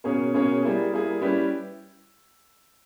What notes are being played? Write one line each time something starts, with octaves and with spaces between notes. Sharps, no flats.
B2 A#3 C#4 G#4 C#5
B2 A#3 C#4 G#4 C#5
G3 A#3 E4 G#4
G3 A#3 E4 G#4
G3 C#4 E4 G4 B4